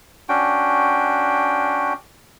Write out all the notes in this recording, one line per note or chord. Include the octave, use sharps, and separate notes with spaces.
C#4 D4 F#4 G5